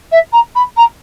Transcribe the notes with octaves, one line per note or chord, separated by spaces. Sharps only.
E5
A#5
B5
A#5